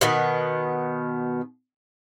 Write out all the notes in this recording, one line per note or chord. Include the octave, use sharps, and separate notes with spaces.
B2 D#3 B3